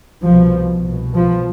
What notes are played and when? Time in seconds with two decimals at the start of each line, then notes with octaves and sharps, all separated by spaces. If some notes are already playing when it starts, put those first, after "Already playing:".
0.21 C2 B2 F3
0.84 C2 B2
1.14 F3